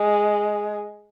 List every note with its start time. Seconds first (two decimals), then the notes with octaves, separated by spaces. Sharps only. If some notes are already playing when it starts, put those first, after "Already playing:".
Already playing: G#3